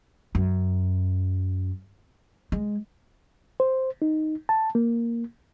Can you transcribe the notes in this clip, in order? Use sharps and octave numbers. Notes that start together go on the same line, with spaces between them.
F#2
G#3
C5
D#4
A5
A#3